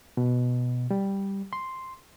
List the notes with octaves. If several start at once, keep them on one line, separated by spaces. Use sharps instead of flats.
B2
G3
C6